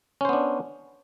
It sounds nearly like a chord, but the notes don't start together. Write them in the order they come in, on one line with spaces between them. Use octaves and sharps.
C#4 C5 B3 D4